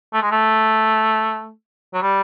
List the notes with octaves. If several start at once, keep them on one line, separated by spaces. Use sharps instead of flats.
A3
G#3
A3
F#3
G3